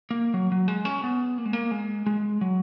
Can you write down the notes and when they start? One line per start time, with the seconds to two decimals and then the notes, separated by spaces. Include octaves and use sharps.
0.11 A#3
0.34 F#3
0.52 F#3
0.68 G#3
0.85 C#4
1.04 B3
1.38 A#3
1.45 G#3
1.53 A#3
1.71 G#3
2.06 G#3
2.41 F#3